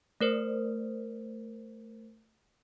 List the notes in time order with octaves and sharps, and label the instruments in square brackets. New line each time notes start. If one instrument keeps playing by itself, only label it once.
[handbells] A3 A#4 C5